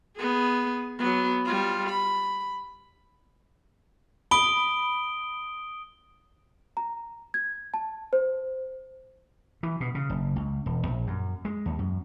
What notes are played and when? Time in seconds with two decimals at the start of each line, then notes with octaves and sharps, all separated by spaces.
0.17 B3 G#4
0.99 F#3 B3
1.45 G3 F4
1.89 B5
4.31 B5 D#6 D7 G7
6.77 A#5
7.34 G#6
7.74 A5
8.13 C5
9.63 E3
9.80 B2
9.95 C#3
10.10 F#1
10.36 C#2
10.66 E1
10.87 A#1
11.07 F#2
11.45 G#3
11.66 D#2
11.79 F#2